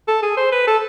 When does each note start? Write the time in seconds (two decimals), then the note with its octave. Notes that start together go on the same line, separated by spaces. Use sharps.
0.08 A4
0.23 G#4
0.37 C5
0.52 B4
0.67 A4